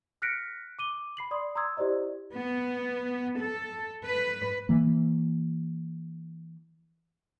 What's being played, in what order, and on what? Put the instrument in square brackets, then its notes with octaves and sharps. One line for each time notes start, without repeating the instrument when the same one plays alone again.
[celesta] F6 F#6 A#6 B6 C#7 D7
D6 D#7 G7
B5 C7 F#7
D5 C6 D#6
A#5 C6 D#6 E6 G#6
E4 G4 C5 D5 D#5
[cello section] B3
A4
B4
[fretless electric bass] E3 A#3